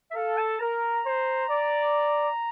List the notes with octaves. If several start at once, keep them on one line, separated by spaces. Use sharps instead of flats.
E5
A4 F5
A5
A#4 A#5
C5
D5